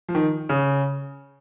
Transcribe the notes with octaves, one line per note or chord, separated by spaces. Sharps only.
F3
D#3
C#3